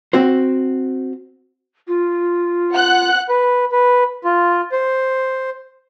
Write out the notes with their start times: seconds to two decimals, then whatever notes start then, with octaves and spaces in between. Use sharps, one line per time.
0.13 C4 F#4 C5
1.88 F4
2.75 F#5 F#6
3.28 B4
3.72 B4
4.24 F4
4.72 C5